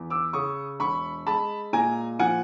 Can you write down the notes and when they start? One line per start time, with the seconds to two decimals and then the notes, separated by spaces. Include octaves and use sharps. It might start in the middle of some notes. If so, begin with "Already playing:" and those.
Already playing: E2
0.10 D6 E6
0.33 C#3 C#6 D#6
0.80 E1 B5 C#6
1.27 G#3 A5 B5
1.73 A#2 G#5 A#5
2.19 F3 F#5 G#5